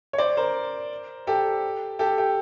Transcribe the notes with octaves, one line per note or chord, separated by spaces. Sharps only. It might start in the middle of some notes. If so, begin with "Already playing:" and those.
C#5
C5 D5
A#4 C5
G4 A4
G4 A4
G4